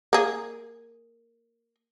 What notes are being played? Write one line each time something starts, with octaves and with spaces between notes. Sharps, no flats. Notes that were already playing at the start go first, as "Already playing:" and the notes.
A#3 G#4